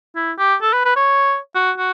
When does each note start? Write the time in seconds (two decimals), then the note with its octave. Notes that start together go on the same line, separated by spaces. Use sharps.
0.15 E4
0.38 G4
0.62 A4
0.73 B4
0.85 B4
0.96 C#5
1.55 F#4
1.78 F#4